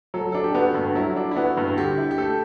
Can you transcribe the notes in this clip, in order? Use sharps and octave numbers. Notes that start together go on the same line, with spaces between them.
F#3 A4
D4 A4
G4
B3 F#4
G2
F#3 E4
D4
E4
B3 F#4
G2
D3 G4
E4
G4
A3 A4